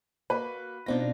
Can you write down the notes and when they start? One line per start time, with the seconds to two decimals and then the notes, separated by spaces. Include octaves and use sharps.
0.30 A#3 F#4 B4
0.86 B2 C4 D4 D#4 F4 A#6